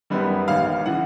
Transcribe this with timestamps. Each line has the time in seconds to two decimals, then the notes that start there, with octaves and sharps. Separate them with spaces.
0.10 F#2 D#3 G3 B3
0.48 A1 G#2 D#3 F5
0.86 C#3 E3 F#5